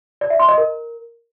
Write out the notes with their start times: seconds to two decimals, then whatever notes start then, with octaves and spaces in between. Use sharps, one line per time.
0.21 D5
0.30 E5
0.39 C6
0.49 D#5
0.58 A#4